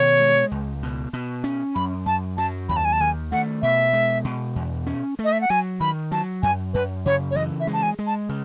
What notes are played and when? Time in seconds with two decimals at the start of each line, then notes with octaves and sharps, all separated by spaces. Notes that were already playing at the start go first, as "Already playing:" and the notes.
Already playing: B2 D#3 C#5
0.20 G#3
0.51 C#2
0.83 B2
1.13 B2
1.44 C#4
1.75 F#2 B5
2.06 F#2 A5
2.37 F#3 A5
2.69 D#2 B5
2.76 A5
2.85 G#5
2.92 A5
3.01 D#3 G#5
3.32 A3 F#5
3.62 B2 E5
3.93 G#3
4.25 B2
4.56 E2
4.87 C#4
5.19 A3
5.24 D#5
5.32 E5
5.41 F#5
5.50 F#3 G#5
5.80 D#3 B5
6.12 F#3 A5
6.43 F#2 G#5
6.74 F#2 B4
7.06 C#3 C#5
7.31 C#5
7.36 E3 D#5
7.60 E5
7.67 G#3
7.73 A5
7.83 G#5
7.99 G#3
8.07 A5
8.29 C#3